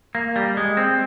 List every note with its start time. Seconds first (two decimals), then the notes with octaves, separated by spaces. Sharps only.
0.15 A#3
0.36 G3
0.57 G#3
0.77 C4